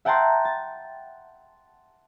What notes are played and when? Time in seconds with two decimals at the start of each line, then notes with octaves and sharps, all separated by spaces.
0.05 E5 F#5 G5 A5 A#5 C6
0.45 A6